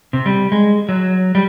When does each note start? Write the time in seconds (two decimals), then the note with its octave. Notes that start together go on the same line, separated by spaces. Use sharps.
0.13 C3
0.26 G3
0.52 G#3
0.89 F#3
1.35 G3